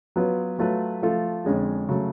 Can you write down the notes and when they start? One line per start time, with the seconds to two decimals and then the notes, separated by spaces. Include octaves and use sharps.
0.16 F#3 B3 F4 B4
0.59 F#3 A3 F4 B4
1.02 F3 A3 F4 A4
1.45 F2 D3 G#3 C#4 G#4
1.89 C#3 F#3 A3